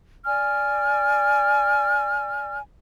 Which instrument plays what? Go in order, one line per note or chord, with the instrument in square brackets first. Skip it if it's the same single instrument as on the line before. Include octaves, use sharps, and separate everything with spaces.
[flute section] D5 G#5 F6